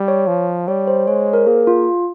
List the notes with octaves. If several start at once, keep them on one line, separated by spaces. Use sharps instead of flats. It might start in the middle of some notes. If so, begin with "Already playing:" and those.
Already playing: G3
C#5
F3
G3 C#5
C5
G#3 C#5
C5
A#4
A#3 G#4
F4